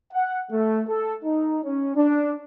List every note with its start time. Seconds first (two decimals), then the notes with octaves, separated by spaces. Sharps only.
0.12 F#5
0.51 A3
0.88 A4
1.24 D#4
1.64 C#4
1.96 D4